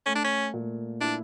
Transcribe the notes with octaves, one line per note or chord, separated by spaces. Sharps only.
A3 C#4
D4
C#4
A#2
D4 E4